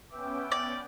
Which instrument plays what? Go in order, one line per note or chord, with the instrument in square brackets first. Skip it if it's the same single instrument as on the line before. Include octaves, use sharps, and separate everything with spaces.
[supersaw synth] B3 C#4 G5 [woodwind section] B4 E5 D6
[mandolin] D5